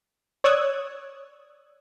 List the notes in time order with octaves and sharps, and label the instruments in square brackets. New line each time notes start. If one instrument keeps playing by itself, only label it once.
[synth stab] C#5 D5 D#6 E6 F#6 G#6